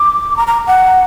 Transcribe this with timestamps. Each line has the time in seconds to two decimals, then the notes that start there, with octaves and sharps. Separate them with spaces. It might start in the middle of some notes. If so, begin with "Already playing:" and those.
Already playing: D6
0.37 A#5
0.47 A#5
0.67 F#5